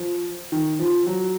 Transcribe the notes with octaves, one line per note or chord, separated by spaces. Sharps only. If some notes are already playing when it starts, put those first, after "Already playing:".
Already playing: F3
D#3
F3
F#3